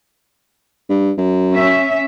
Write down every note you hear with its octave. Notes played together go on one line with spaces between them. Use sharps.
G2
F#2
C#4 E5